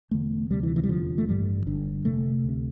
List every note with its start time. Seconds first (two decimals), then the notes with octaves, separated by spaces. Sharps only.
0.11 E1 E2 D3 A3
0.50 D2 C3 G3
0.63 E3
0.76 E3
0.83 G3
0.89 F1 E2 D3 F3
1.18 A3
1.28 A1 G2 D3 G3
1.66 G1 G2 D3
2.05 F1 F2 C3 A3
2.44 D2 C3